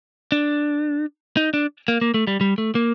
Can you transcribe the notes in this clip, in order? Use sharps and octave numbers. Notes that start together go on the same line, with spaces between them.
D4
D#4
D4
A#3
A#3
A3
G3
G3
A3
A#3